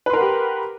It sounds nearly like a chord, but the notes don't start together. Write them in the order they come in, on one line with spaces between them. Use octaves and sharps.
B4 C6 A#4 F#5 G4